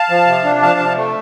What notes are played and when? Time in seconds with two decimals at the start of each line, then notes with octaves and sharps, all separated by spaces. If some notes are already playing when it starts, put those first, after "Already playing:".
Already playing: F5 A5
0.10 F3
0.27 C3
0.44 D4
0.62 F3 F5 A5
0.79 C3
0.96 A3